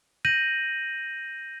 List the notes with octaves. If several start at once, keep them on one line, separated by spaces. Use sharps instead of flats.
G6 A#6 D#7 F#7